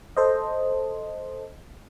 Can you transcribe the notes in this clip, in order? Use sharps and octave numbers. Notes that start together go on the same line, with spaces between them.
A4 C5 D#5